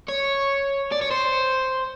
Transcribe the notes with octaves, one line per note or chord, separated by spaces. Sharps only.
C#5
D5
C#5
C5